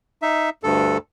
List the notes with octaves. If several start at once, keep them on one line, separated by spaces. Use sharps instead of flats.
D#4 E5
D2 G2 A4